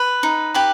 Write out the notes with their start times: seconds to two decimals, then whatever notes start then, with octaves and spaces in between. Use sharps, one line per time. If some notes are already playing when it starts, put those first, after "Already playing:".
Already playing: B4
0.23 D#4
0.54 G4 B4 B5